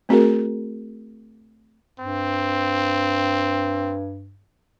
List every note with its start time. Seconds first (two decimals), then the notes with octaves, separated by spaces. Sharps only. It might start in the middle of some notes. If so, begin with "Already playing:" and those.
0.09 A3 C4 F#4 G#4 A#4
1.99 G2 C4